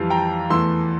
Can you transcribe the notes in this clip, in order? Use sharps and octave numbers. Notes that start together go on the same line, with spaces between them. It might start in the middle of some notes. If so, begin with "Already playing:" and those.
Already playing: F2 E3 G3 F5
G5 A#5
E2 E3 A3 C6 E6